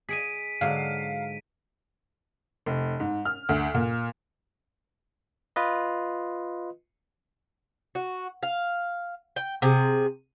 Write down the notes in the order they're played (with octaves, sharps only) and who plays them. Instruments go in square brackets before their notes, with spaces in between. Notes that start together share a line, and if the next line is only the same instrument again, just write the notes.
[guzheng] G#4 D#5 G#5 [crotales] B6 D7 D#7
[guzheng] G#2 D3 F#3 [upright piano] F5
[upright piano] F1
G#2
F6
D2
A#2
[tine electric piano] F4 B4 D#5
[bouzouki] F#4
F5
G5
C3 G#4